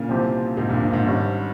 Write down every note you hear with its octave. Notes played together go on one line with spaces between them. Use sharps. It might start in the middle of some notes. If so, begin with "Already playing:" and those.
Already playing: A#2 C#3
C2 C3 F3 C4 G4
G#2 C3
G2 A#2
G2
G#2
G#1 G2 G3 C#4 G4